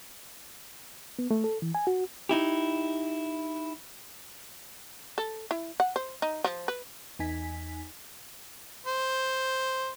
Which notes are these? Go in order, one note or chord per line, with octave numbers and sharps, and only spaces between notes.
B3
A3
A4
E3
G#5
F#4
D#4 E4 G4
A4
E4
F#5
C5
D#4
F3
B4
E2 D#4 G#5 B6
C5